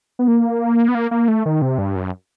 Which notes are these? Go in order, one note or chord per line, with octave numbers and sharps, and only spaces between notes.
B3
A#3
B3
A#3
A#3
A3
D#3
C3
G2
F#2